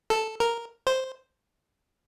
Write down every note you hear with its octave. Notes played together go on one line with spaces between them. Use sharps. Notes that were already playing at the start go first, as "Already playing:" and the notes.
A4
A#4
C5